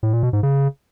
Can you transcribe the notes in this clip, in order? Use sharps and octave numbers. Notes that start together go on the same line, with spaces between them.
A2
A#2
B2
G#2
C#3